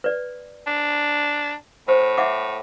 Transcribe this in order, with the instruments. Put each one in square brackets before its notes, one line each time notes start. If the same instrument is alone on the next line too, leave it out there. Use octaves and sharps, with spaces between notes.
[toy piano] B4 D5
[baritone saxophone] D4
[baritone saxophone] A2 [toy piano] C5
[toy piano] E5 F#5 D6